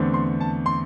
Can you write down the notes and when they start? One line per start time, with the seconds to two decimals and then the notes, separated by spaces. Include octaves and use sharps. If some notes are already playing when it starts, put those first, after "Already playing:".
Already playing: E2 D3 A3 C4
0.14 C6
0.41 A5
0.66 C6